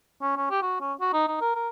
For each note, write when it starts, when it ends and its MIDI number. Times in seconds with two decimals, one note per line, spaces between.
0.22 0.36 61
0.37 0.50 61
0.50 0.61 67
0.62 0.78 66
0.81 0.93 61
1.00 1.10 66
1.13 1.27 63
1.28 1.41 63
1.41 1.55 70
1.55 1.69 70